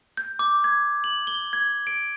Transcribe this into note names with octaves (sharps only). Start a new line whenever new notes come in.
G6
D6
G#6
F#7
G7
G#6
D7